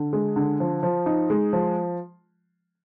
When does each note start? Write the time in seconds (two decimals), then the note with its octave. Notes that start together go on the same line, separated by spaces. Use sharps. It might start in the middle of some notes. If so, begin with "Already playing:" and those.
Already playing: D3
0.13 G#3
0.36 D3
0.60 F3
0.83 F3
1.06 D#4
1.30 G#3
1.53 F3